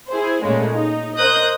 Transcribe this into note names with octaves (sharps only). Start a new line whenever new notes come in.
E4 G#4 C5
A#2 C#3 G#3 A3
D#4
A#4 C5 D#5 D#6 F#6 G6